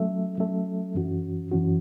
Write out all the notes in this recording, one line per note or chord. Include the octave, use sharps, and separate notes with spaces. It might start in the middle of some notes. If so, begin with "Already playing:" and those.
Already playing: F#3 A3 C#4 A4 E5
F#3 A3 C#4 A4 E5
F#2 E3 C#4 F#4
F#2 E3 C#4 F#4